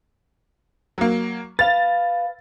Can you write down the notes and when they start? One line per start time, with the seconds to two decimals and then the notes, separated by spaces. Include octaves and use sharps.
0.98 F#3 A#3
1.59 B4 F5 A6